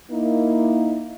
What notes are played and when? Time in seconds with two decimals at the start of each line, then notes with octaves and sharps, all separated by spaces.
0.11 A#3 D#4 E4